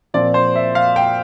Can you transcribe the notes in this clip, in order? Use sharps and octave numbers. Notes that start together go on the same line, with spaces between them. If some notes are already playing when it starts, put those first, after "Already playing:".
A#2 F3 C4 D5
C5
E5
F5
G5